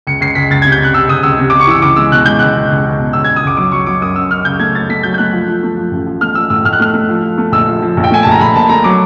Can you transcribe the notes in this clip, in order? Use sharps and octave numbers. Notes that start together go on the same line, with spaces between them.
C#2 C#7
C#2 C7
C#2 B6
C#2 A6
C3 G#6
G6
C3 F#6
C3 E6
C#2 D#6
C#2 E6
C3
C3 D6
C#6
E3 E6
C#2 D6
G#3 E6
B2 F#6
G#3 G6
C#2 F#6
C#2
C#2
C#2
B2
C#2 E6
C#2 G#6
D#6
C#2 D6
F#3 D6
F#3 C#6
F#3 D6
F#2 D#6
F#2 E6
F#2 F6
C#3 G6
A3 G#6
F#2 A6
A3 B6
F#3 G6
G6
A3 F#6
F3
F3
A3
F3
A1
F3
A3 F6
F3 E6
A2 E6
A2 F6
F#6
A3 F6
A3
F3
F3
A3
A#1 E6
F3
F3
A#1
G5
A3 G#5
A#1 A5
A#5
A#1 B5
A#2 A5
A3 A#5
F#3 D6